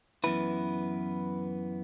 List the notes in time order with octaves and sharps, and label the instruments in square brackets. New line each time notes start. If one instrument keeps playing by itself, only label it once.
[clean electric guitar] F#2 E3 B3 E4 B4